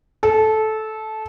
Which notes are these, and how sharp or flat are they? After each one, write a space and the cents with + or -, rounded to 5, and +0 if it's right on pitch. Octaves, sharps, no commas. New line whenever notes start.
A4 -15